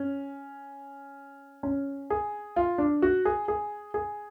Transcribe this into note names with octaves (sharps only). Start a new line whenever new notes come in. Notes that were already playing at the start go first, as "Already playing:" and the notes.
Already playing: C#4
C#4
G#4
F4
D4
F#4
G#4
G#4
G#4